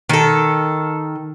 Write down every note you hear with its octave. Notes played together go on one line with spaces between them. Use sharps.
D#3 A4